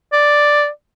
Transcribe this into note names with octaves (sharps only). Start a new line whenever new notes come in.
D5